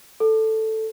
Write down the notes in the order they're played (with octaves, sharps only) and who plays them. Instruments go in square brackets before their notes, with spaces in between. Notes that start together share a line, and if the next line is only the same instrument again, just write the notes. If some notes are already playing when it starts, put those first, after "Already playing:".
[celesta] A4